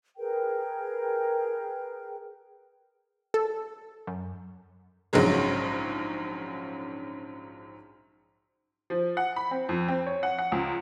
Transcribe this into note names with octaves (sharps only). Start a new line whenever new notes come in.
G#4 A#4 B4 G5
A4
F#2
A#1 G#2 C#3 F#3 G#3
F3
F#5
B5
C4
F2
C4
C#5
F#5
F#5
C#2